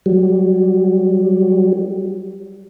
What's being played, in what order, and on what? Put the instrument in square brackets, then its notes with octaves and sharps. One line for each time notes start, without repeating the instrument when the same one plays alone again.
[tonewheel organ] F#3 G3